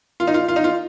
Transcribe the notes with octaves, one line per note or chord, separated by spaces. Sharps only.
F4
D#4
F4
F4
D#4
F4